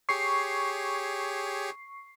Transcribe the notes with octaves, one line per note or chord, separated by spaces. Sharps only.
G4 G#4 C#5 C#6 C7